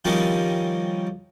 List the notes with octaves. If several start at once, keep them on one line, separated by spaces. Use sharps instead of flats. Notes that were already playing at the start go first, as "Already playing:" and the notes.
D#3 F3 G3 C4 C#4 D#4